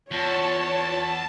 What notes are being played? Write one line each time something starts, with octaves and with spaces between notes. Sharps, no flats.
E2 F4 C#5 A5